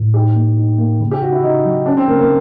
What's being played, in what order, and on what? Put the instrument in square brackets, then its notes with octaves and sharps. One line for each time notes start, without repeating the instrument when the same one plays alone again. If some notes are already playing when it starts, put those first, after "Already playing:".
Already playing: [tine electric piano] A2
[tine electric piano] D#4 [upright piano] G4
[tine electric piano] A#3
D#4
A#3
C#3
[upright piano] G4
[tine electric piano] C#3 [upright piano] F#4
[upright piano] E4
[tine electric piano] C#3 [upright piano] D#4
[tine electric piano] F#3
[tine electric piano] C#4 [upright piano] D4
[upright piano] C4
[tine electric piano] C#3 [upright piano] A#3
[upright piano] A#3